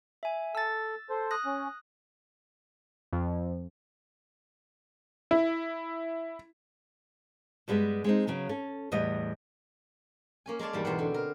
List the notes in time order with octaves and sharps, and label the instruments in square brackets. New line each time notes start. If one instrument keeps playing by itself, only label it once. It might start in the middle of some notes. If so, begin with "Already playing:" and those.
[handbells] E5 G#5
[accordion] A4 [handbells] E6 A6
[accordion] A4 C5
[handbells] D#6 F#6 A#6
[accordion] C#4
[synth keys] F2
[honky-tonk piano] E4
[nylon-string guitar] G2 G3 G#3 B3
G#3 C4 D#4
C#3 F#3 B3
C#4 A4
E2 A2 G3 B3 D#5
[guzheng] A#3 C#4 G#5
G#3 A#4 C#5 D5 A5
E2 G#2 G3 A#3
E2 B2 C4 C5 F#5
D3
A#4